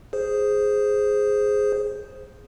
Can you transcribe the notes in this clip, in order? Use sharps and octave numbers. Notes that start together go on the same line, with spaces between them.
G#4 C5